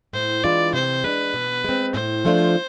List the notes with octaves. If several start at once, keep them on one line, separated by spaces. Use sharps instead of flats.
A2 C5
E3 G#3 D4 F4 D5
C3 C5
G#3 D4 B4
B2
G#3 C4
A2 C5
F3 A3 D4 F4